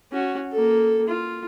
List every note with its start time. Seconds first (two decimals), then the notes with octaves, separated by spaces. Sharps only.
0.12 C#4 F#4
0.52 A#3 A4
1.08 F4